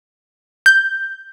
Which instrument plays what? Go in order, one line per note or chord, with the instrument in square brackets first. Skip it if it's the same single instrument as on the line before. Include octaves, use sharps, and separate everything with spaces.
[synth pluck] G6